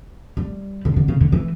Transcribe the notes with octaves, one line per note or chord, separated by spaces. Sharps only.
G3
D3
D3
C#3
D3
E3